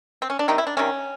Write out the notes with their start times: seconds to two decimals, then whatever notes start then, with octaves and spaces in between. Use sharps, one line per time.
0.22 C4
0.30 C#4
0.39 D4
0.48 C3 D#3 G3 D#4
0.58 E4
0.67 D4
0.77 C3 D#3 G3 C#4